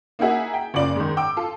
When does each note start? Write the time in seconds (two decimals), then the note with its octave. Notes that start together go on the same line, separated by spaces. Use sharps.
0.19 A#3 D#4 E4 F#4 G#4 E5
0.54 G5
0.74 F#1 C#3 F4 D5 F#7
0.96 G#2 D#3
1.17 G5 D6 E6
1.37 F4 A4